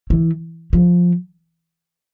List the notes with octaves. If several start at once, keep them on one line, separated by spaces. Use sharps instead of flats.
E3
F3